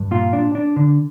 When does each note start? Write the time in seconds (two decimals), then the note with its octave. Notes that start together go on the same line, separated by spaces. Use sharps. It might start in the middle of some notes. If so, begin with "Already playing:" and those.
Already playing: G2
0.11 A#2 F4
0.33 D4
0.55 D4
0.76 D3